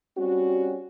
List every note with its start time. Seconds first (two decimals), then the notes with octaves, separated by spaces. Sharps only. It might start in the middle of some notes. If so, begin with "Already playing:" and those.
0.18 G3 C4 C#4 F#4